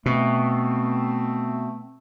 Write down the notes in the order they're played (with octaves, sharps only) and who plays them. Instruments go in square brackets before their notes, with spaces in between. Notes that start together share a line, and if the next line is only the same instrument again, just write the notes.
[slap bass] B2 [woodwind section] A3 C4